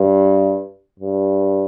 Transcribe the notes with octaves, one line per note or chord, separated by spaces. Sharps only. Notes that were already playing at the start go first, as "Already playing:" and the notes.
Already playing: G2
G2